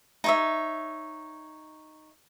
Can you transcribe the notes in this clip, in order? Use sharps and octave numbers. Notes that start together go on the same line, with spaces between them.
D#4 C#5 E5